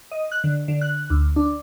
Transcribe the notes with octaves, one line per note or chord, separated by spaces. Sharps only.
D#5
F#6
D3
D3
F#6
D2
D4